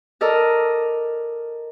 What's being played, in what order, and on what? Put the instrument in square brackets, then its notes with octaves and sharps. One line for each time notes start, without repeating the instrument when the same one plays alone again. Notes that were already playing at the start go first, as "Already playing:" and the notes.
[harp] A4 A#4 D5 D#5